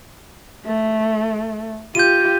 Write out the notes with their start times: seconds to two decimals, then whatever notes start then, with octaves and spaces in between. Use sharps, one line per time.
0.65 A3
1.95 F4 G4 G6 D#7